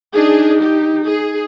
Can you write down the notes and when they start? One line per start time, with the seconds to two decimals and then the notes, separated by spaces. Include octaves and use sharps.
0.14 D4 D#4 G#4
0.61 G4
1.05 G#4